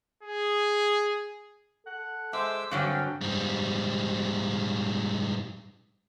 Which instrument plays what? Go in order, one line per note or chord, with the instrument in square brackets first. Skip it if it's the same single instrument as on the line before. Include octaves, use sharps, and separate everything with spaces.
[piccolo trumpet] G#4
[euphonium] A4 [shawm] F#5
[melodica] G#3 D6 E6 [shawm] C5 [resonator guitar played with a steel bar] E5
[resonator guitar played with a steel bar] G2 D3 F#3 [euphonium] C4 [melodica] C#4 [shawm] G5
[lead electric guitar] G#2 G3